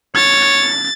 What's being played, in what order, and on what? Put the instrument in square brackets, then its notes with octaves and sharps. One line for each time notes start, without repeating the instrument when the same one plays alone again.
[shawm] C#5 [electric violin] A6